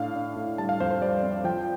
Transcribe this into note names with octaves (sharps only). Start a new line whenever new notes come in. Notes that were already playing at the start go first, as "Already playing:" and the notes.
Already playing: A2 D4 F5
D4
A2
G3 A5
F5
F2 C5
C5
G3 D5
C4
F3 G5